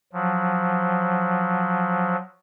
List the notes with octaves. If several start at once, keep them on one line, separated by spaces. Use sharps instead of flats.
F3 F#3